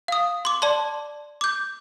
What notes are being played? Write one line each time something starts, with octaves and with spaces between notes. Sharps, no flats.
F5 D#6
C6 D6
D5 A5 C6
D6 G6